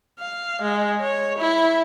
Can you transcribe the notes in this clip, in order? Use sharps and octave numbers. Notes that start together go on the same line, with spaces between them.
F5
G#3
C#5
E4